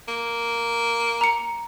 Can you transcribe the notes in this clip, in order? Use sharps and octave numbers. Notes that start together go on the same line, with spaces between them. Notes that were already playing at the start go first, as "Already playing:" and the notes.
A#3
A#5 C#7